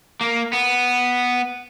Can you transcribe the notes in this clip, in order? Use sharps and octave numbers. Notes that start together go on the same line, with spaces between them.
A#3
B3